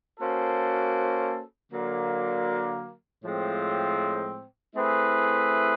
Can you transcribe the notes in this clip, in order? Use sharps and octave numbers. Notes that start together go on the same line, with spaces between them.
A#3 C#4 F#4 A4 C5
D3 F#3 A#3
A2 F3 G#3 C4
A3 C4 E4 G#4 B4